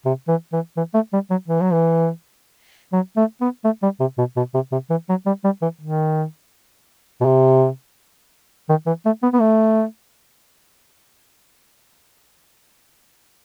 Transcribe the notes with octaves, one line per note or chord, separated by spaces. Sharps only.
C3
E3
E3
E3
A3
G3
F#3
E3
F#3
E3
F#3
A3
B3
A3
G3
C3
B2
B2
C3
C3
E3
F#3
G3
G3
E3
D#3
B2
C3
D#3
E3
A3
B3
B3
A3